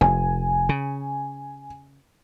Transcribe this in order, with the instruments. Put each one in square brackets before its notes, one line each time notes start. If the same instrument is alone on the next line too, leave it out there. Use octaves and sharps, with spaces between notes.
[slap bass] F1 [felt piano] G#5
[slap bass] C#3